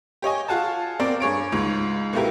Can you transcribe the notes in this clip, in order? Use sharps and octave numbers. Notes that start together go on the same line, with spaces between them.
G4 C#5 D#5 G#5
F4 G#4 F#5 G#5 A5
C4 A#4 D5 F5
G2 G#4 C#5 D7
C#2 G#2
B2 A3 A#3 E4 G4 A#4